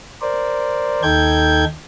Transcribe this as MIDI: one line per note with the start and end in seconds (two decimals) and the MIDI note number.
0.21 1.03 70
0.21 1.03 72
0.21 1.03 74
1.03 1.65 39
1.03 1.65 63
1.03 1.65 69
1.03 1.65 79
1.03 1.65 91
1.03 1.65 92